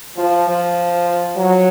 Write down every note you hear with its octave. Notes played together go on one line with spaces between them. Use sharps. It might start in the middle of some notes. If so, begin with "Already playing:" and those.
F3
F3
F#3